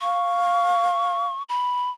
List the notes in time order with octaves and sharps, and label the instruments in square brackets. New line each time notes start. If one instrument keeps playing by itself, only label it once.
[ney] F5 [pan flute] C#6
[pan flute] B5